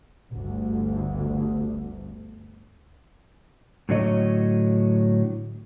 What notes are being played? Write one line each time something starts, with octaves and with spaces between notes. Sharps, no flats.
G1 D2
A2 D3 F#3 C#5 D#5